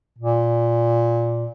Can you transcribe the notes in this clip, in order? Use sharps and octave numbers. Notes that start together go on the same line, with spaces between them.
A#2